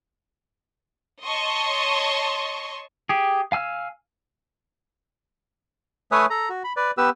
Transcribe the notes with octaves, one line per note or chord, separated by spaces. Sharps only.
C#5 D#5 A5 C6 C#6
G4 G#4
F5 G#5 E6 F6
A3 B4 C#5 E5 G#5 D#6
A4 A#5
F#4
B5
B4 D5
B3 G4 B4 E6